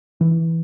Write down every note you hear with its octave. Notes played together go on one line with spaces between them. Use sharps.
E3